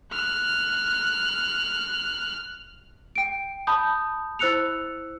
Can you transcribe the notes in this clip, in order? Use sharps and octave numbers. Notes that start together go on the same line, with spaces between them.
F6 F#6
G5 D7
A5 B5 D#6 G6
E4 C5 E6 F#6 C#7 F7